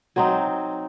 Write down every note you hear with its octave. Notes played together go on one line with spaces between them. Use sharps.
F#3 C4 D#4